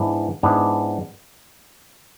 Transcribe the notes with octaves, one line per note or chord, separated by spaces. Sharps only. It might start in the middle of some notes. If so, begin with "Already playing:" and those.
Already playing: G#2 E3 B3 D4
G#2 E3 B3 D4